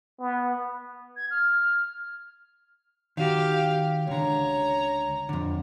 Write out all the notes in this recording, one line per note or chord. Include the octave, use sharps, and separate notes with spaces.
B3
G#6
F6
D#3 F#4 G4 F5
C#2 D3 C#5 A#5
F2 D3